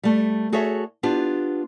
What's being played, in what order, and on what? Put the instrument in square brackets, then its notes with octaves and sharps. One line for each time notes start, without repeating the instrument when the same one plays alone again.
[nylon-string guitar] G3 A3
F#4 G#4 A4 C#5 E5
B3 D4 F4 G4